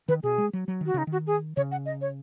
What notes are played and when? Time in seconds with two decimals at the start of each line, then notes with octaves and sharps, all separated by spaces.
0.08 D#3 B4
0.23 B2 G#4
0.38 G#3
0.53 F#3
0.68 F#3
0.81 D#3
0.86 F#4
0.94 C#3 D#4
1.07 D#3
1.12 F#4
1.27 G#4
1.57 C#3 C#5
1.72 F#5
1.86 D#5
2.01 C#5